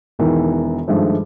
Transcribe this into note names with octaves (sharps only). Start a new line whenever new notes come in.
E1 B2 D#3 E3 A#4
G2 D#3 F3 G#3 A3